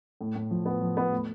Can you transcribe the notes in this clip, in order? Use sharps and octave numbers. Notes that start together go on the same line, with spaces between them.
A2
A2
F3
B3
F3
B3
A3